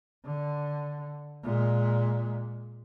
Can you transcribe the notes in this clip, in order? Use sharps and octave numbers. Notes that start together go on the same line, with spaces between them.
D3
A#2 G#3